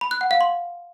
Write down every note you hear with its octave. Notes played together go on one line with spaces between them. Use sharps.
B5
F#6
F#5
F5
C6